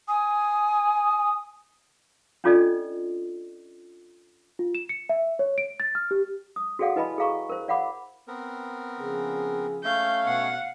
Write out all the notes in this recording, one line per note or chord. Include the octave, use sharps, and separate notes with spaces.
G#5 D#6
C#4 D4 F4 A4 D5 D#5
F4
E7
C#7
E5
C#5
D7
A6
F6
G4
D#6
F#4 G#4 A4 D5 F5 F#5
E4 B4 D#5 G#5 A5 B5
G#4 A4 F5 A#5 C#6
A#4 C5
D5 F5 F#5 B5 D6
B3 C4 A#4
C#3 F3 G#4
A3 C#4 F5 G6
B2 B3 F#5